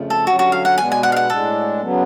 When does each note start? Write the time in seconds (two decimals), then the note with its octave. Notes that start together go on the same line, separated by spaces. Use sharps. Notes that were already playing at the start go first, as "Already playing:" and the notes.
Already playing: F2 C#3 F3 A3
0.10 A4
0.27 D3 F#3 C#4 F#4
0.39 F#4
0.52 F5
0.65 F#5
0.78 B2 G#3 B3 D4 G#5
0.92 G#5
1.03 F#5
1.12 F5
1.17 F#5
1.30 A2 G#3 D4 A4
1.81 C#3 F#3 B3